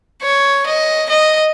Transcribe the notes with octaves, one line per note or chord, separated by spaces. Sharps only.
C#5
D#5
D#5